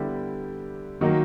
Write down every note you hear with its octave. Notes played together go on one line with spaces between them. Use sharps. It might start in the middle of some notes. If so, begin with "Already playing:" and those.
Already playing: D3 G3 B3 E4 G4
D#3 F#3 A#3 D#4